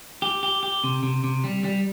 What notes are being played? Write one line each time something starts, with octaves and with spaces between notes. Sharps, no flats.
G4
G4
G4
C3
C3
C3
G3
G3